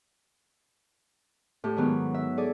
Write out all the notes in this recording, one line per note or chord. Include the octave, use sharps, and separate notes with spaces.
A2 G4
G#2 D#3 F#3 B3
E5
G#4 A4 D5 D#6